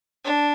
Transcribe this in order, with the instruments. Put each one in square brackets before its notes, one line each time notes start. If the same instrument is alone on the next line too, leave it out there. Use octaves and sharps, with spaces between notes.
[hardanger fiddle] D4